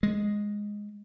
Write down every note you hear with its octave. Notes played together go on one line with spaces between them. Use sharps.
G#3